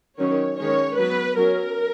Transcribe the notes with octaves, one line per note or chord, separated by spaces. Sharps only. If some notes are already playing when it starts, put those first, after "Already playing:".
D#3 F#3 C#4 C#5
D#3 G#3 C#4 C#5
F#3 B3 B4
F#3 C#4 A#4